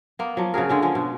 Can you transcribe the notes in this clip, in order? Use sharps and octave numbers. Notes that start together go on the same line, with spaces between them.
A#3 B3
F3 F#3
C#3 F#4 G#4 A#4
D3 G#3 C#4
F3 G#3 C#4
B2